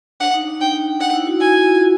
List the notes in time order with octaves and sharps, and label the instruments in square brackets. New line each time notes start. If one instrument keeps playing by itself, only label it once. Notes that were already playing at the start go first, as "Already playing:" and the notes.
[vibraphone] D4 [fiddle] F#5
[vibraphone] D#4
D4
[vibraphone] D#4 [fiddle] G5
[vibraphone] D#4 [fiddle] F#5
[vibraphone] E4
E4 F#4
[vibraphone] E4 F#4 [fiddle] G#5
[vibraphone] E4
F4
E4 F#4